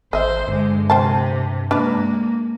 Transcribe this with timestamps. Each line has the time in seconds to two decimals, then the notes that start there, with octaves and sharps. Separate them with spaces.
0.13 G#1 C5 D#5 E5
0.48 G2 D3 G#3
0.90 C3 C4 C5 A5
1.71 G#3 A#3 D4 B4 D5